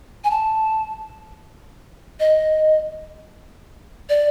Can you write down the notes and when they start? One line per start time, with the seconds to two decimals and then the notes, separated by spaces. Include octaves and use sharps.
0.24 G#5
0.31 A5
2.20 D#5
4.09 D5